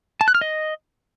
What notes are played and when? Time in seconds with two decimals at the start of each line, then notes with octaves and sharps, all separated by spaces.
0.21 A5
0.28 F#6
0.35 F6
0.41 D#5